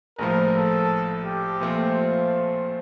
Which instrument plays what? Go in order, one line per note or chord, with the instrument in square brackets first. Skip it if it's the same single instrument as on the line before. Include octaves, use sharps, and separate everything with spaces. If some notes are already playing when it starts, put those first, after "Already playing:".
[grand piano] A#1 A2 F3 [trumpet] A#4
[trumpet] A4
G4
[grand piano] A#2 F3 A3 C4
[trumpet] F4